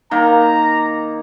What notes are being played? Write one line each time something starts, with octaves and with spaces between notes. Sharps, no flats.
D#3 A#3 A#5